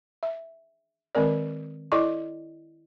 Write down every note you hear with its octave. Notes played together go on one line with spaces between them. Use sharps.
E5
D#3 G#3 C4 A#4 D5
E4 A4 D5 D#5 C#6 D6